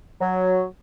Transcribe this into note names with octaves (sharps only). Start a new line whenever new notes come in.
F#3